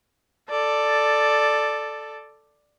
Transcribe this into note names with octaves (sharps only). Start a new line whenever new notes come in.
A4 D5